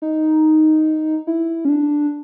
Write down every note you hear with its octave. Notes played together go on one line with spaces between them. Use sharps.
D#4
E4
C#4
D4